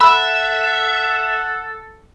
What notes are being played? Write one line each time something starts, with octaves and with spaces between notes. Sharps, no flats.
A4 E5 F#5 B5 E6